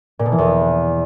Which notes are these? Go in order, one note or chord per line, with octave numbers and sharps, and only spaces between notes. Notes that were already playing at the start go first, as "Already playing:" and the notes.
A#2
B2
E3
E2